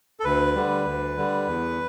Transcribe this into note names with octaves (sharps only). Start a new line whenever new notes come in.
A4
D2 B4
D3 G3
D2
D3 G3
E2